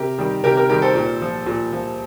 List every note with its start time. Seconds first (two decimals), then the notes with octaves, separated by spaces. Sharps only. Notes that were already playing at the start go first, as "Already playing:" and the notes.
Already playing: C3 G4 A#4
0.19 D#3 G3
0.44 C3 G4 A#4
0.57 G4 A#4
0.69 D#3 G3 G4 A#4
0.82 A4 C5
0.95 A#2
1.22 F3
1.46 A#2
1.73 F3